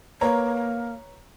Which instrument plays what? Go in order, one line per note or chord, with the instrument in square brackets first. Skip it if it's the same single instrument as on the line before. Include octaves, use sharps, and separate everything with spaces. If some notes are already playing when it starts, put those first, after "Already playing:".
[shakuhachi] A#3 [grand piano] B4 C#5 A#5